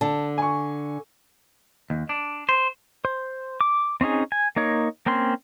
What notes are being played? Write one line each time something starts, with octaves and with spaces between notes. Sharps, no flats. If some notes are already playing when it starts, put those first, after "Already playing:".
D3 A5
G#5 C#6
D#2
D4
C5
C5
D6
C4 C#4 D#4 G#4
G#5
A#3 D#4 C#5
A#3 C4 C#4 C6